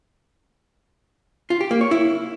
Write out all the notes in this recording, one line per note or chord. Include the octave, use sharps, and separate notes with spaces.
F4
G4
A#3
C#5
E4